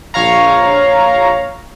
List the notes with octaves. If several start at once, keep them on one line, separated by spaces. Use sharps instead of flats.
A#1 C#5 F5 A#5